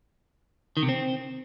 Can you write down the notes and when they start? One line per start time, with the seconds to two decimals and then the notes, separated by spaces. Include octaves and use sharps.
0.77 D#3
0.83 C3
0.89 C4